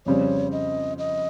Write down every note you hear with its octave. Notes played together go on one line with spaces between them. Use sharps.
F2 C#3 G3 C4 C#5
D#5
D#5